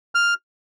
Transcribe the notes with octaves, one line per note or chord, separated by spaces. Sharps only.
F6